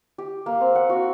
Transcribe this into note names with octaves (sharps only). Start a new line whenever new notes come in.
G4
A#3
C4
F#5
F#4